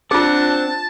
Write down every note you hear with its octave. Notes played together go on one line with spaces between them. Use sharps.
C4 D4 F4 G#4 F#5 A5